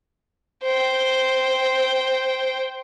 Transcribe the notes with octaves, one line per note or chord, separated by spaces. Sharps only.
C5 G5